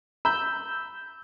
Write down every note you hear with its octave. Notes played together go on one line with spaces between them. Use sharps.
B5 E6 G6